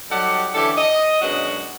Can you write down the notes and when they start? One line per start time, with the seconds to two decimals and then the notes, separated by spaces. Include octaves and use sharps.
0.10 F#3 G3 D#4 G4 A4 F#5
0.54 D3 E3 C#4 G4 A4
0.77 D#5
1.22 F#2 B2 F#3 G#3 D4 F#4